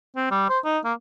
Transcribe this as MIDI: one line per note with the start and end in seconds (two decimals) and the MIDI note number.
0.16 0.28 60
0.31 0.48 55
0.49 0.59 72
0.65 0.78 63
0.85 0.93 58